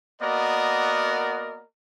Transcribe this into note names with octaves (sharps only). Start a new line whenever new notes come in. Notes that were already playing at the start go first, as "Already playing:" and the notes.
A#3 B3 F#4 A#4 D5 D#5